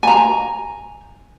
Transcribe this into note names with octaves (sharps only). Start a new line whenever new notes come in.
G#5 A#5